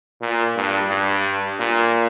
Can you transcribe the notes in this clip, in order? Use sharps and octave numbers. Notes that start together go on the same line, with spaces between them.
A#2
G2
G2
A#2